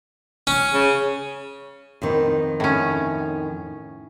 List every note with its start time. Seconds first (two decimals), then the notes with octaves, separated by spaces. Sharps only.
0.47 C#4
0.74 C#3
2.02 F2 D#3 B3
2.60 A2 C#4